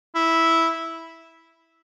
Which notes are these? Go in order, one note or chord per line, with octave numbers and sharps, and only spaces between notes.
E4